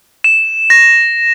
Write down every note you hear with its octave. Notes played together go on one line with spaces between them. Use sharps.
E7
A#6